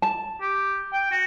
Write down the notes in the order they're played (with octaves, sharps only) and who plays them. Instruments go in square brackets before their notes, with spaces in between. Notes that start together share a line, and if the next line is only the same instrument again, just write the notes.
[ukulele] A5
[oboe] G4
G5
F#4